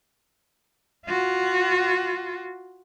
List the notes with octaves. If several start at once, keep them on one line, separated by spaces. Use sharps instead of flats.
F4 F#4